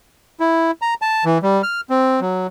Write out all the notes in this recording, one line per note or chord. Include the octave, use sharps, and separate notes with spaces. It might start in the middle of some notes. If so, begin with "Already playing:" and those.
E4
A#5
A5
E3
G3
F6
C4
F#3